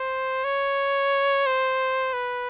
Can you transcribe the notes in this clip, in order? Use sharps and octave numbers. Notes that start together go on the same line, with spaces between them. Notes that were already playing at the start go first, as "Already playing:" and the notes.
Already playing: C5
C#5
C5
B4